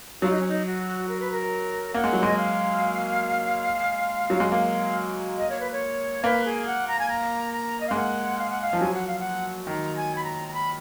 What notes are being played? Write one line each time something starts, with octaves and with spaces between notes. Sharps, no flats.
F#3 F4
D#4
C#4
D#4
F#4
A#4
B4
A#4
A#3 F#5
G#3
F#3
G#3 D#5
F5
F#3
G#3
A#3 F5
D#5
C#5
B4
C#5
A#3 B4
G#4
F#5
A#5
G#5
A#5
A#5
D#5
F5
G#3
A#3 F#5
F5
F#5
F5
F3
F#3 G#5
F#5
F5
F#5
D#3 A#5
G#5
B5
A#5
A#5
B5